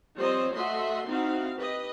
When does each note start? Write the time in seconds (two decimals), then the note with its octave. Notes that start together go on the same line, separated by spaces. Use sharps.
0.16 F3 G3 C4 C5 C#5 D#5
0.53 A3 F#4 D#5 E5 F#5 C6
1.07 C4 D#4 E4 F#4 F5
1.57 G4 B4 D#5